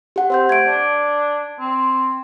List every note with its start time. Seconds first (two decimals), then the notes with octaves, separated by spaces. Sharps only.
0.16 G4 F#5
0.30 C4 C5 F#5 G6
0.49 A3 G#6 D7
0.66 D4
1.60 C4